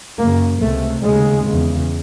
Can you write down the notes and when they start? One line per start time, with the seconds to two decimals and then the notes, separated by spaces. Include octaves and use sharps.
0.18 F#2 C#3 A#3
0.60 C#2 C3 A3
1.02 D#2 C#3 G#3
1.44 E2 C#3